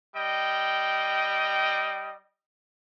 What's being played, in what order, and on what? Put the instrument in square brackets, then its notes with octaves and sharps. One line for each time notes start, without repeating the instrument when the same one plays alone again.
[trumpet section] G3 D#5 G5